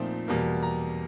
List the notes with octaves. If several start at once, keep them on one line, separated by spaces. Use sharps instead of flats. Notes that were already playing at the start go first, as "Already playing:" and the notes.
Already playing: A#2 F3 A3 C4 D#4
E2 B2 G3 A#3
A#5